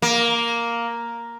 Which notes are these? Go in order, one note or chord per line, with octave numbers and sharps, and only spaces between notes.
A#3